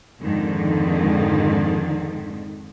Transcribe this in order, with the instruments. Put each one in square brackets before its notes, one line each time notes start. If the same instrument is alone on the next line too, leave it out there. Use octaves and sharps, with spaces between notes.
[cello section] F2 G#2 D3 D#3